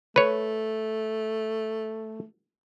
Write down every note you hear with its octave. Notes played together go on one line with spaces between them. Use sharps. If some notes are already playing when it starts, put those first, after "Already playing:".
A3 B4 C#5